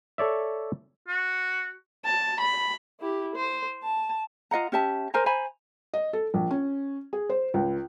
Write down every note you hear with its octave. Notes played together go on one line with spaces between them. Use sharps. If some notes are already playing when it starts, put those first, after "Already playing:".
A4 C#5 D5 E5
F#4
A5
B5
E4 G4
C5
A5
F4 D#5 F#5 A#5
C#4 G4 E5 A5
A#4 C5 G#5 A#5
C5 G#5 A#5 B5
D#5
A4
A#1
C#4
G#4
C5
C#2